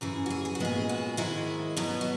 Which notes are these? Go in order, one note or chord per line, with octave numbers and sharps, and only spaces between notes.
F#2 C#3 E3 G#4
F#4
G#4
G#4
F#4
A#2 G#3 B3 G#4
F#4
G#2 D#3 G#3 E4
B2 F#3 B3
F#4